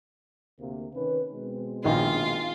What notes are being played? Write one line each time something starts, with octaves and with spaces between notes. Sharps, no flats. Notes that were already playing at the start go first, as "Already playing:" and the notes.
D2 C3 A#3
D#3 C#4 B4
B2 G#3 C4
A#1 D#3 F4 D#5